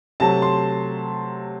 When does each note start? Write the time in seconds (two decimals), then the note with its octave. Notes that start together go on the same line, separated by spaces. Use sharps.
0.20 C3 F#3 A3 A5
0.42 C6